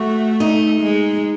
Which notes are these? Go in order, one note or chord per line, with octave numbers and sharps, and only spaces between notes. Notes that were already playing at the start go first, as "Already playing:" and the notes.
Already playing: A3 F#4
D#4
G#3